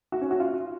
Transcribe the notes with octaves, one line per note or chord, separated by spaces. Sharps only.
F#4
C#4
F#4
F4